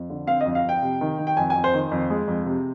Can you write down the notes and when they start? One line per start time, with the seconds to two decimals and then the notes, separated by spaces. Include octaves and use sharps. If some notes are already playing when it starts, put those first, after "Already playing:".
Already playing: F2
0.10 D3
0.27 C4 F5
0.41 F2 D#5
0.55 F5
0.64 F2 G5
0.82 C3
1.01 D#3
1.19 D#3
1.27 G5
1.37 F2 G#5
1.50 G#5
1.56 F2
1.64 C5
1.74 D#3
1.91 F2
2.10 G#3
2.28 F2
2.46 C3